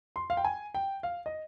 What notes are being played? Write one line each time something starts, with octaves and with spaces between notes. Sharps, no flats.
C6
F5
G5
G#5
G5
F5
D#5